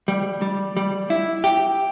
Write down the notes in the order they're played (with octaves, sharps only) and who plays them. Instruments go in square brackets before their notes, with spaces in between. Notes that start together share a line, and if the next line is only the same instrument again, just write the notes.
[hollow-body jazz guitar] G3
G3
G3
E4
G4